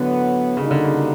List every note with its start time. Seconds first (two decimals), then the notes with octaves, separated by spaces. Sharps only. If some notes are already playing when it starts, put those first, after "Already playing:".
Already playing: A2 D3 F#3 B3
0.57 C#3 G3 A#3 D#4 F#4
0.71 D3
0.84 C#3